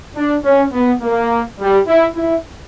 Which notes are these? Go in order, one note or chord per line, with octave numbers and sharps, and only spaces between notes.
D4
C#4
B3
A#3
G3
E4
E4